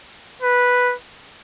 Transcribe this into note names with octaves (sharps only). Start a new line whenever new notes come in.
B4